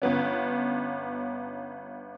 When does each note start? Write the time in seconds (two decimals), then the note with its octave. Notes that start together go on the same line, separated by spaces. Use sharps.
0.02 G1 B3 C#4